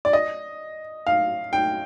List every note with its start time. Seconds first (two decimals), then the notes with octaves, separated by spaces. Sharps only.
0.05 D5
0.13 D#5
1.07 F5
1.53 G5